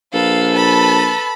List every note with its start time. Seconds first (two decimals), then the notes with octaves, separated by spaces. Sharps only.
0.14 A#1 A4 B4 F5
0.55 A5 B5